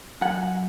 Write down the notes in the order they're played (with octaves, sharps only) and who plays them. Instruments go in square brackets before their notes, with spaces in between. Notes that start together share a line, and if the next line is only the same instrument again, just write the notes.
[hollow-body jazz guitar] F#2 F#5